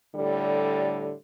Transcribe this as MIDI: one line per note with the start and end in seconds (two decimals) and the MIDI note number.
0.14 1.11 45
0.14 1.11 50
0.14 1.11 55